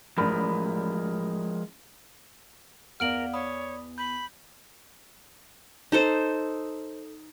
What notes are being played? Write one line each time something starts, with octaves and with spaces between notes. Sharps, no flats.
A1 F3 G#3 A#4 D5 B5
E2 A#4 D5 F5 F#5 F6 D7 F#7
C#5 D5 B5 D#6
B5 G6
D#4 A4 C5